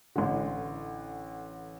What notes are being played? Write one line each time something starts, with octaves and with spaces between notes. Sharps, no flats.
A1 D3